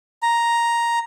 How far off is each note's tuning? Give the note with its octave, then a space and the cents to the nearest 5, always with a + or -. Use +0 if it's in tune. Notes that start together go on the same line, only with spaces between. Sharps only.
A#5 +5